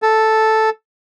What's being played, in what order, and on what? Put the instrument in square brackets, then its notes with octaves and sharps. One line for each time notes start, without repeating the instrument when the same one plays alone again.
[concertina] A4